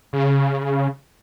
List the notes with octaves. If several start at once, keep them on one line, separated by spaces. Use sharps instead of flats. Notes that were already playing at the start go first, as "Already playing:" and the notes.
C#3